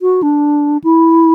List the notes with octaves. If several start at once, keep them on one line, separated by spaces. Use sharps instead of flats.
F#4
D4
E4